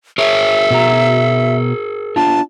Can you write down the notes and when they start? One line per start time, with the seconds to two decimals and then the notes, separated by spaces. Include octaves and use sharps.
0.18 G#4 A#4 C#5 E5
0.71 B2 F#4 A#5
2.16 B3 D4 F4 A5